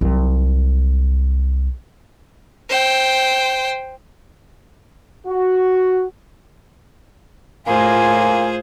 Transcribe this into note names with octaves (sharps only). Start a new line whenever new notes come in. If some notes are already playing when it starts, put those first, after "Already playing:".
C2 F#3
C5 G5
F#4
A2 A#3 F4 G#4 C5 G#5